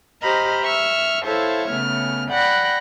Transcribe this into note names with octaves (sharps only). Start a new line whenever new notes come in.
G4 C5 D#5 A#5 B5 F6
E5 C#6 E6 F6
E4 A4 C5 C#5 E5 F5
C#3 A3 B3 F6
D5 F#5 G5 B5 F#6 A#6